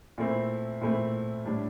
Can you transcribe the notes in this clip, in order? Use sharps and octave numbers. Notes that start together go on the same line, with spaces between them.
A#2 A3 C4 E4
A#2 A3 C4 E4
A2 G3 D4